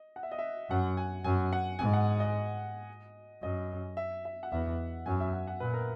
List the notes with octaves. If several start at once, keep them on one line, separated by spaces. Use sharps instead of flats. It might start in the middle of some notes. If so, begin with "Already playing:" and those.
Already playing: D#5
F#5
E5
D#5
E5
F#2 F#5
G#5
F#2 G#5
F#5
G#2 G#5
F#5
D#5
F#2 D#5
E5
E5
F#5
E2 E5
F#2 G#5
E5
F#5
F#5
A#2 B4
A#4